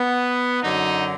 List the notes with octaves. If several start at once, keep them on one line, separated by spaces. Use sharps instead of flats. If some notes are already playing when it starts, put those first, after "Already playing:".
Already playing: B3
F#2 D3 F#3 D#4